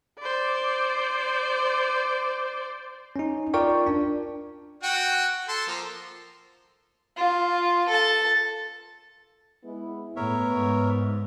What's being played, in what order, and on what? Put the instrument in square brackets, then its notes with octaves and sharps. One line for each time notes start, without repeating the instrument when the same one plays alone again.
[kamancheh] C5 D5
[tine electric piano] C#4 D#4
F4 A#4 D5 G5 C#6
D4
[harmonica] F#4 F#5 G5
A4 A5 C6
F3 A#3
[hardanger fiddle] F4
A4 A5
[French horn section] G#3 B3 E4
[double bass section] A2 [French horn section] B3 [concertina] A#4 C#5 E5
[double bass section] G#2